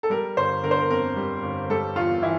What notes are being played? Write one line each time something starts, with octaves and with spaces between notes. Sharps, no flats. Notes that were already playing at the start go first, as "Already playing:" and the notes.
A4
G3 A#4
G1 C5
D3 A#4
C5
A#4
F2 A#4
G3
G1
G3 A4
E2 F4
E3 E4